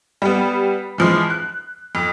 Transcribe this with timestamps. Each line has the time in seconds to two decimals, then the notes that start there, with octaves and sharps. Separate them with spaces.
0.22 G3 B3
0.98 E3 F3 G#3
1.30 F#6
1.95 F2